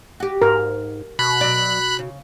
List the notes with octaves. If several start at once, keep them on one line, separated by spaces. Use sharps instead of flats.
F#4 G4
G#2 A#4
B2 B5 F#6
F#3 D5
C#3